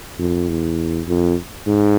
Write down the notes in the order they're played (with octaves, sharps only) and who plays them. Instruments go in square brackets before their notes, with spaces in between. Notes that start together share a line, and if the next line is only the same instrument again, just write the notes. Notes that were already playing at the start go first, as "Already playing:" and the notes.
[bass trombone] F2
E2
F2
G#2